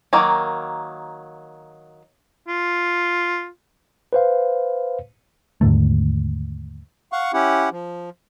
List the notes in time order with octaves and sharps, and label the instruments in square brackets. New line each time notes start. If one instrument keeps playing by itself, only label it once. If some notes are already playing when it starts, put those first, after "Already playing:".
[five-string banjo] D#3 F#3 A#3
[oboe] F4
[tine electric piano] B4 C5 F5
[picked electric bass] D#2 G#2 D3 A3
[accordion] F5 F#5 C#6
C#4 E4 G4 F#5
F3